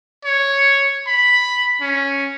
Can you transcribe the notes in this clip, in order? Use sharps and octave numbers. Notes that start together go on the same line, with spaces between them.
C#5
B5
C#4